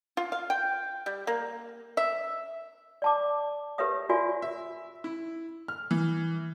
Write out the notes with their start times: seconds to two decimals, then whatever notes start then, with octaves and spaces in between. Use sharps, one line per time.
0.17 F4
0.32 F5
0.50 G5
1.06 G3
1.27 A#3
1.97 E5
3.02 D5 A5 D6
3.78 G4 A#4 B4 C#5 E5 D#6
4.09 F4 F#4 A#4 D5 E5 G#5
4.42 E5
5.04 E4
5.68 F6
5.91 E3